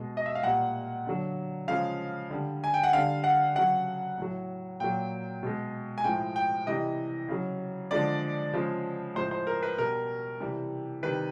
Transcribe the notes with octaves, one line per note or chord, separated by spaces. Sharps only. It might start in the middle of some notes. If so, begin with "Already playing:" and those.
Already playing: B2 G#3
D#5
E5
F5
A#2 G3 F#5
D3 F#3
C#3 F3 G#3 F5
D3 G3
G#5
G5
F#5
D3 G3 F5
F#5
C#3 F#3 F#5
A2 F#3
A#2 F#3 G5
B2 G#3
G#5
A2 F3 G#3 G5
G5
C3 E3 G3 D#5
C#3 F#3
D3 F3 G#3 D5
C#3 F3 G#3
A2 F3 G#3 C5
C5
A#4
B4
B2 G3 A#4
C3 E3 G3
C3 D#3 G3 B4